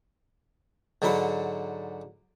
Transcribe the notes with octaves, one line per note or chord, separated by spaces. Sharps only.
G#2 D3 F#3 B5 C6